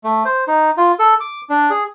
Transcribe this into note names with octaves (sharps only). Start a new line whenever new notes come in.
A3
C5
D#4
F4
A4
D6
D4
G#4